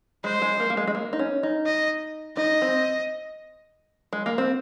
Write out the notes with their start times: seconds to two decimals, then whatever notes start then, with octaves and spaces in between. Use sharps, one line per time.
0.24 G#3 C5
0.42 G#3
0.60 A#3
0.70 A#3
0.77 G#3
0.87 G#3
0.95 A#3
1.13 D#4
1.19 C#4
1.43 D#4
1.66 D#5
2.37 D#4 D#5
2.62 C4
4.13 G#3
4.26 A#3
4.38 C4